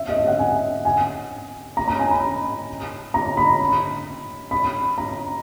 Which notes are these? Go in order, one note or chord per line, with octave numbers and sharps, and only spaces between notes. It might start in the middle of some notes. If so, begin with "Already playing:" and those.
Already playing: E5
D#5
E5
F#5
G#5
G#5
A#5
A#5
G#5
B5
A#5
B5
B5
A#5